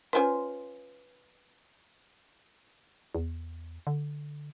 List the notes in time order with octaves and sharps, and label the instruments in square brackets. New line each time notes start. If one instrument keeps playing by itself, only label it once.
[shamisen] C#4 F4 C5 [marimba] B4 G#5
[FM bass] E2
D3